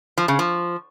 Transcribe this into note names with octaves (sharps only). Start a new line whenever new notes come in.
F3
C#3
F3